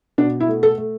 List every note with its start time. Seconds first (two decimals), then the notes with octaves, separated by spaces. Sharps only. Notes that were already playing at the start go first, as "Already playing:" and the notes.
0.18 B2 D4
0.40 E4
0.48 A3
0.63 A4
0.78 A3